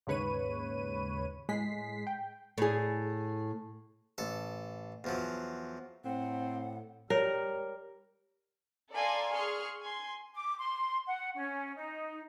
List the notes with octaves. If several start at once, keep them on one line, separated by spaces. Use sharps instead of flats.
D#2 G#2 C#3 B4 C#5 D#7
A2 G#3 B6 C7
G5
A2 G#4
A1 A4
E2 F3 F#3
A2 C4 F#5
G3 A#4 C#5
A4 D5 F5 G#5 A#5 C6
G#4 C6 C#6 F6
G#5 C6
D6
C6
F#5
C#4
D#4